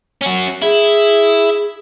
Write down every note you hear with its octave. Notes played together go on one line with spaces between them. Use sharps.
C#4 F#4
E4 G#4